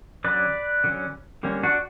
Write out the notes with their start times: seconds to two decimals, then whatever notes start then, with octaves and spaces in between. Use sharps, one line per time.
0.24 D3 F#3 C#4 B4 D5
0.84 D3 F#3 C#4
1.43 D3 G3 A#3 C#4
1.63 D4 F#4